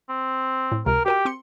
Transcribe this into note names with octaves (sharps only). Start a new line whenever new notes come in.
C4
A2
C#2 C3 A#4
F#4 G4 A#4 G5
C4 C6 C#7